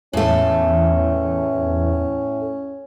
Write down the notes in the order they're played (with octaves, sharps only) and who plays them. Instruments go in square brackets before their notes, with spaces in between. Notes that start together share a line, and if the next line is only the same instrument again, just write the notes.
[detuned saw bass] E2 [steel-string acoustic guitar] A2 A3 [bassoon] C#4